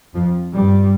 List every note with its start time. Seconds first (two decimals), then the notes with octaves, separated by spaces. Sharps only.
0.15 F2 F3
0.54 G2 G3